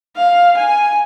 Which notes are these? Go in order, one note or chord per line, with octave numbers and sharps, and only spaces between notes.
F5
G#5